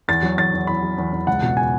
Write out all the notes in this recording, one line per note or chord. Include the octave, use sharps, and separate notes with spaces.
E2 A6
F#3
E2 A6
E2
E2 B5
F#3
E2
E2
C#2 F#5
B2
G#5